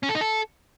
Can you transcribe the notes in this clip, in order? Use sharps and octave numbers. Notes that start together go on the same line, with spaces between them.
C#4
A4
D#4
A4